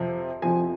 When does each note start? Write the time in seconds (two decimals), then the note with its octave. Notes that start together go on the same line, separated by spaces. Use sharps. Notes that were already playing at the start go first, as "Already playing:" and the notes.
Already playing: F2 C3 F3
0.42 F2 C3 F3 G#5